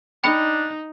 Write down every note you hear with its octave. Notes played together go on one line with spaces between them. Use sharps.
D4 D#4 G5 B5 C#7